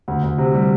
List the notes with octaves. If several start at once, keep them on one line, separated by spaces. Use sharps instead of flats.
D2
D2
C3
G3